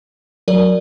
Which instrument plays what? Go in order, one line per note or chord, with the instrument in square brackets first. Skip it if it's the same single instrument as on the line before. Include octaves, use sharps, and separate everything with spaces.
[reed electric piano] F#3 [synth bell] A#4 D5